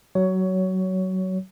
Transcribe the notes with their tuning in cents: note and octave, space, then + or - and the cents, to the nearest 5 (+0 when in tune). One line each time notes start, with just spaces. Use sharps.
F#3 +20 C#5 +15